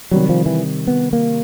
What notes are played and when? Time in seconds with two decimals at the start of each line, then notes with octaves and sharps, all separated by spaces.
0.11 C3 D#3 F#3 G3
0.29 F3
0.46 E3
0.87 B3
1.13 A#3